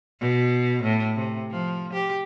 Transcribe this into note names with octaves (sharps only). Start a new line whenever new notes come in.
B2
A2
C3
F3
G4